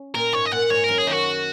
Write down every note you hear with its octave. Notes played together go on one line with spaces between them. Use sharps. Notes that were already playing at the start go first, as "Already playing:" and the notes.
Already playing: C#4
A#2 A#3 A#4
G#2 G#3 C#5
D#5
A#2 A#3 F#5
G#2 G#3 C#5
F#2 F#3 A#4
G#4
D#3 D#4 F#4